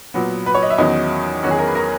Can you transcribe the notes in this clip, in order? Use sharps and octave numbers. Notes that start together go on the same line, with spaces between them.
A#2 F#3 B3
B4
C#5
D#5
E5
E2 D#3 F#3 C#4 D#5
E2 D#3 F#3 C#4 F#4
G#4
A#4
B4
A#4